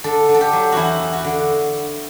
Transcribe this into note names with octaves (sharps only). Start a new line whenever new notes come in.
D3 A4
D3
A4
G4
F#3
E2 E4 F#4
E2
F#4
D3